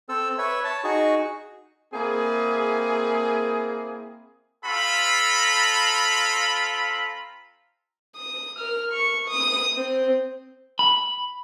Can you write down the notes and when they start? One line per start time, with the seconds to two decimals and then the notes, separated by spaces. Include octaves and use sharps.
0.09 C4 A4 E6
0.38 B4 C#5 E5
0.64 C#5 A5
0.84 D#4 F#4 G#4 C#6
1.93 A#3 C4 E4 G#4
4.65 C4 F4 A4 A#5 B5
8.17 D#6
8.59 A#4 F6
8.93 C#6
9.29 D#6
9.77 C4
10.79 B5